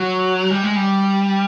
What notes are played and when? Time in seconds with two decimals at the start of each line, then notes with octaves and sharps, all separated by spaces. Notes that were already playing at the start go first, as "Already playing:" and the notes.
Already playing: F#3
0.51 G3
0.63 G#3
0.76 G3